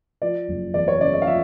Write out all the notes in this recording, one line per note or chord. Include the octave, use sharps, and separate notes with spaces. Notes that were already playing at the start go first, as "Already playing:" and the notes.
F3 D5
F#1
E2 D5
C#5
C#3 D5
D#5
F5
F3 E5